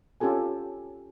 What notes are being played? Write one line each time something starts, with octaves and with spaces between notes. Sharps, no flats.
C#4 F4 G4 A4 G#5